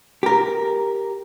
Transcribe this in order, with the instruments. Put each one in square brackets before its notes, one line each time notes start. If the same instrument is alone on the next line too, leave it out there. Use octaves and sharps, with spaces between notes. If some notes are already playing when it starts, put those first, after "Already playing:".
[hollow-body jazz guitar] G4 A#4